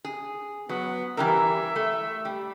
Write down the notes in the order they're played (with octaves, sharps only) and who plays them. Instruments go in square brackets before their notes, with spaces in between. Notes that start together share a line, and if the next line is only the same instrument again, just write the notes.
[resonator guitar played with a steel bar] G#4
[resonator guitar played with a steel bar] F#3 [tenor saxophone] B3
[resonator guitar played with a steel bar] E3 G3 A#4 [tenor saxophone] E5
[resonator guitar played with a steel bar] A3
G3